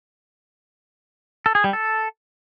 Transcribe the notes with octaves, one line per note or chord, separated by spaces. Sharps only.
A4
G#4
G3
A4